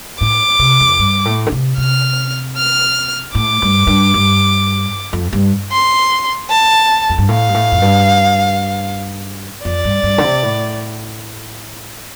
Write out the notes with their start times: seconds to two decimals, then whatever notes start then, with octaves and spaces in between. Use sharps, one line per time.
0.20 A2 D6
0.59 C3
0.80 F2
0.99 G2
1.25 A2
1.47 D3
1.52 C3
1.78 C3 F6
2.56 F6
3.35 A2 D6
3.62 G2
3.87 G2
4.14 G2
5.13 F2
5.33 G2
5.72 C6
6.50 A5
7.09 F2
7.18 G2
7.29 A2 F5
7.49 G2
7.54 A2
7.72 F2
7.82 G2
9.64 F2 D5
9.85 G2
10.03 G2
10.18 D3
10.24 C3
10.43 A2